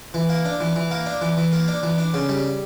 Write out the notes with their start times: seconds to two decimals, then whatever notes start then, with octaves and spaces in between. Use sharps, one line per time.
0.14 E3
0.29 A#3
0.45 D4
0.60 E3
0.76 E3
0.91 A#3
1.06 D4
1.21 E3
1.37 E3
1.52 A#3
1.68 D4
1.83 E3
1.98 D4
2.14 C#3
2.29 G3